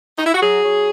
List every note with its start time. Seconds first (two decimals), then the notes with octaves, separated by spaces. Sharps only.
0.18 D#4
0.26 E4
0.34 F#4
0.42 F#3 G#4
0.64 F#3